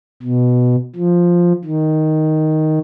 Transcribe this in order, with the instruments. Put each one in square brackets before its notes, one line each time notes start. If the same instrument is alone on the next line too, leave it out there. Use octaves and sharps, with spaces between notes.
[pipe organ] B2
F3
D#3